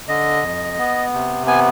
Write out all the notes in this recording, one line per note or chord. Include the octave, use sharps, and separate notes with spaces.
D3 D#5
F2
B3
C3
B3 G#5